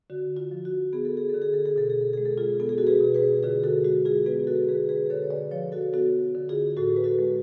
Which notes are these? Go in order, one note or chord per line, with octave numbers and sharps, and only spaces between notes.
D3 F#4
F4
F3
F#4
B3 G#4
A4
G#4
A4
D3
G#4
A4
G#4
B2 A4
G#4
A4
G#3 G#4
A4
F4 G#4
B3 A4
G#4
F#4 A4
G#4 B4
B2
G#4 B4
D3 F4 G#4
F#4 A4
G#3 F#4
F4 G#4
B3 G#4 B4
F#4 A4
D3 G#4 B4
G#4 B4
D3 A4 C#5
C#5
B4 D5
F3 C#5 F5
F#4 A4
B3 F#4 A4
D3
F4 G#4
A2 F#4 A4
B4
F#4 A4
G#3